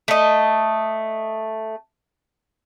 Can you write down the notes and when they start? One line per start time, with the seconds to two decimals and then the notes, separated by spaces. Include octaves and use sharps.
0.08 A3 D#5